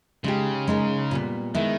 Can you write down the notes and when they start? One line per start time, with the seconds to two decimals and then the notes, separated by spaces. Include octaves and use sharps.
0.24 C#3 G#3 D#4 G4
0.68 G#3 D#4 A#4
1.11 A#2 G3 B3
1.55 D#3 G#3 B3 E4